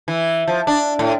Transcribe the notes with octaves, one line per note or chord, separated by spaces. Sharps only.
E3
F3
D4
A2